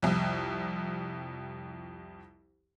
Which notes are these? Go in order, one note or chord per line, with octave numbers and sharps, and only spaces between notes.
C2 F2